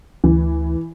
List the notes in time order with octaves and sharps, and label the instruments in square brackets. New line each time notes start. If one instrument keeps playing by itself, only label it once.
[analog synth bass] D2 [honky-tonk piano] E3